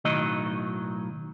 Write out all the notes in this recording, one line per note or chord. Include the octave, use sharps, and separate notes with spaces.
B1 A2 D#3 F#3 D#5